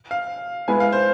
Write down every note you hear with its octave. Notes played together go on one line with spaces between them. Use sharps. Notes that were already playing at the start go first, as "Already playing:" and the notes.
F5
G#3 B3 E4 B4 G#5
F5
C5